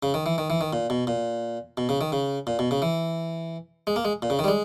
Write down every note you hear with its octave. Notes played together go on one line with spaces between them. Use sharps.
C#3
D#3
E3
D#3
E3
D#3
A#2
B2
A#2
B2
C#3
D#3
C#3
A#2
B2
C#3
E3
G#3
A#3
G#3
A#2
C#3
D#3
G3
G#3